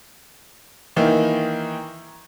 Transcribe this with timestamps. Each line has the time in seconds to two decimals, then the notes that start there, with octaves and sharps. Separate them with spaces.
0.96 D#3 E3 A#3 D#4